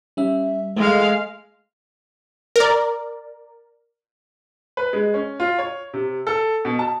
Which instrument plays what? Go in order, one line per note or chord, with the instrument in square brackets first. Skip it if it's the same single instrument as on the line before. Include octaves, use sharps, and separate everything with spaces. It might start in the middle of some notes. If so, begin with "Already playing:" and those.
[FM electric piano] G3 C#4 E5
[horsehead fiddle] G#3 F5 [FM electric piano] A3
[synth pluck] A#4 D5
[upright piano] B4
G#3
C#4
F4
C#5
C3
A4
B2
A5